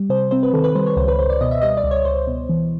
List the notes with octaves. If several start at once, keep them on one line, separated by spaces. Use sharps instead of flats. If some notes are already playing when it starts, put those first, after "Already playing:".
Already playing: G3
C3 C5
C4 C5
B4
D#3 A4
B4
G3 C5
C#5
C#2 C5
B4
C#2 C5
D5
B2 D#5
E5
G3 D#5
D5
C#2
C#5
C#2 C5
B2
E3